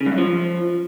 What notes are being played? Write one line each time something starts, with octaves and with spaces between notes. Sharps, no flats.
C#3
G2
F#2
F3